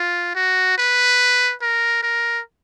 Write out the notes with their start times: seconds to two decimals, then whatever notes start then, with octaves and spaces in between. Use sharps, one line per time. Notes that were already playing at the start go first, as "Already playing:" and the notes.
Already playing: F4
0.35 F#4
0.78 B4
1.62 A#4
2.03 A#4